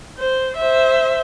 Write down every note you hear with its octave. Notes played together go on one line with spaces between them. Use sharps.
C5
C5 E5